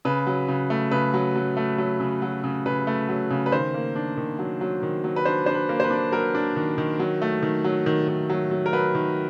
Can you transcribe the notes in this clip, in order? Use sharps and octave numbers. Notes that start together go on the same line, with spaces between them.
C#3 B4
F#3
C#3
A3
C#3 B4
F#3
F#3
A3
F#3
C#3
F#3
C#3
C#3 B4
A3
F#3
C#3
B4
D#3 C5
A#3
D4
D#3
F#3
F#3
D#3
F#3
B4
D4 C5
D4 C5
B4
A#3
C5
B4
D4
F#3 A#4
D4
D#3
D#3
F#3
A3
D#3
F#3
D#3
D#3
F#3
F#3
A#4
F#3 B4
D#3